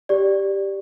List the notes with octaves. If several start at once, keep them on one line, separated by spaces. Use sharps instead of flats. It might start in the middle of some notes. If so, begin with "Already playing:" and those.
G4 D5